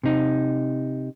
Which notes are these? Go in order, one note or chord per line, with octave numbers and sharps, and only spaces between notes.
C3 D#4